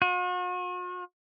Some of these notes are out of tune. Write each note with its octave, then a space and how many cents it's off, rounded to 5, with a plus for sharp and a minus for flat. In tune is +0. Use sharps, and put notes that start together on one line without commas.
F#4 -45